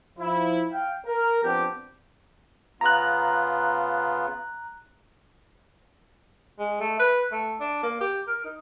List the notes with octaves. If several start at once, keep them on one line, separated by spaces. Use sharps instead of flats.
F3 E4
F5 G5
A#4
F3 B3 C4 D4 G4
C#3 B3 F4 A#5 F#6
G#3
A3
B4
A3
D4
A#3
G4
A#4
D#4